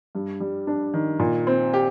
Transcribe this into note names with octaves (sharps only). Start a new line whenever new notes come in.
G2
G3
D4
D#3
A#2
C4
G4